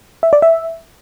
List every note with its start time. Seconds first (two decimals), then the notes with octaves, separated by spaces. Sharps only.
0.23 E5
0.33 D5
0.42 E5